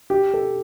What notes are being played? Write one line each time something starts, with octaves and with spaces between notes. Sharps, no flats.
G4
A4